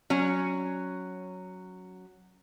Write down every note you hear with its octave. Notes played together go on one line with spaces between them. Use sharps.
F#3 C#4